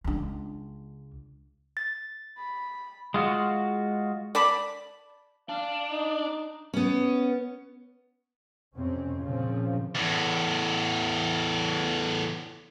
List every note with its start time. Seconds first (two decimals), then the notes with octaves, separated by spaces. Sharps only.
0.04 C#2 D4
1.77 A6
2.37 B5
3.14 G#3 F4 F#4
4.35 D5 A5 B5
5.49 D4 F5
5.92 D#4
6.74 B3 C#4
8.76 F2 C3 C4 C#4
9.20 A#2 C#3 F3 C4
9.95 E2 A2